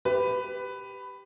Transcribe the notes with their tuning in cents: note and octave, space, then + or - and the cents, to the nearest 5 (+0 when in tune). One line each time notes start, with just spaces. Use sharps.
G4 +0 B4 +15